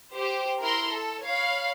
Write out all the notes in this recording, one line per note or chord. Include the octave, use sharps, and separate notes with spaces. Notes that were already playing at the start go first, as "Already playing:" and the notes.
G4 C5
E4 A#4 A#5 C6
A4
C#5 F5 B5